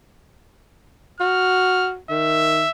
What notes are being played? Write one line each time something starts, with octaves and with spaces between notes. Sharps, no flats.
F#4 F6
D#3 E5